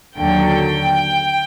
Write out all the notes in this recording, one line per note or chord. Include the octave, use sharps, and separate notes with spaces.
D#2 D3 F#3 G5